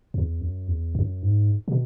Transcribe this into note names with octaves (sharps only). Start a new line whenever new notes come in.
E2
F#2
E2
F#2
G#2
B2